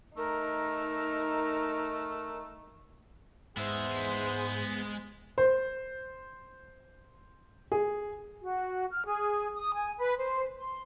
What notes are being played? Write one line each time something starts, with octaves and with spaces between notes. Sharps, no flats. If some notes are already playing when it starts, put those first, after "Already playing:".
A3 D#4 A#4
G#2 G#3 B3 G#4 C5 E5
C5
G#4
F#4
F6
G#4
D#6
G#5
B4
C5
C6